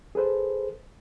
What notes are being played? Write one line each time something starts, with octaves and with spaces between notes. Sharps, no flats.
G#4 A4 B4 C5